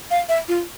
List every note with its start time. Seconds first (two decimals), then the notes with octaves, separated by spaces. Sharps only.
0.11 F5
0.29 E5
0.48 F4